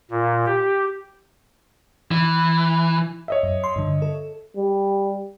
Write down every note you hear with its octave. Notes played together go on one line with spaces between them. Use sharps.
A#2
G4
E3
C#5 D#5 E5
F#2
C6
G2 D3
A4
G3